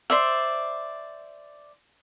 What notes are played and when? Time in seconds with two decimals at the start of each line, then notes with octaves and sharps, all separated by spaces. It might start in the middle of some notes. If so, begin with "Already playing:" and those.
0.10 C5 D5 E5